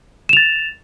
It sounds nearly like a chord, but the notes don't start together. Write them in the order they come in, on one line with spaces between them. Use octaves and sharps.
E7 F7 A6